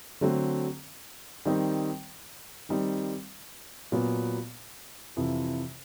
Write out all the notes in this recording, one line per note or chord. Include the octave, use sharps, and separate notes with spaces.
D3 F#3 A3 C4
D#3 G3 C4 D#4
D#3 G3 C4 D#4
A#2 F#3 B3
F2 C3 E3